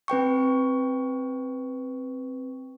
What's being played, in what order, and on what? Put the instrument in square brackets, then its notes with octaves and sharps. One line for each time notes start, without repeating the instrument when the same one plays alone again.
[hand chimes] C4 B4 G5 C#6